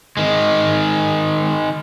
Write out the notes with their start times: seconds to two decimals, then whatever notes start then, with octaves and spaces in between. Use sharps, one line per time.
0.17 D#3 G#3